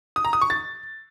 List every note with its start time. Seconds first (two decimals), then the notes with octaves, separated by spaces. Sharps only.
0.16 D#6
0.25 A#5
0.33 D#6
0.41 C#6
0.50 A6